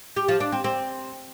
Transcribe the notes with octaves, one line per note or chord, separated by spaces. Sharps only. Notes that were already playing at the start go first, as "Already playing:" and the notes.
G4
F3
D4
C4
C4